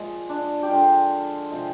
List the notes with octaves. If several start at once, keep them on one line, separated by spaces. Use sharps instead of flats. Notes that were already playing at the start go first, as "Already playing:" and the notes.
Already playing: A#2 F3 G#3
D4
G4
D3 F3 G#3 F4
C3 F3 G#3